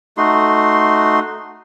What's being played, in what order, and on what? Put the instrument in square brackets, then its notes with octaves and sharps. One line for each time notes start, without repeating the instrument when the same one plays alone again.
[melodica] A3 D#4 F#4 C6